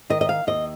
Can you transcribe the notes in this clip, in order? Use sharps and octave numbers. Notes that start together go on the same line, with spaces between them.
D#3 D#5
D#5
F5
D#2 D#5